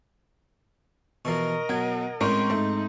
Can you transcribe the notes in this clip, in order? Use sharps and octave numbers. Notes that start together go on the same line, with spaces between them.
B2 E3 F3 A#4 D#5 C#6
B2 F#3 F#5 G#6
A2 G#3 C4 C#4 A#4 C6 C#6 G6
G#2 A3 D#4